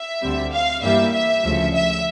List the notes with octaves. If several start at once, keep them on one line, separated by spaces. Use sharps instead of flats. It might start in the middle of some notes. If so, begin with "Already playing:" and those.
Already playing: E5
D2 D3 G3 C4
F5
G2 E3 G3 A#3 E5
E5
D2 C#3 F3
E5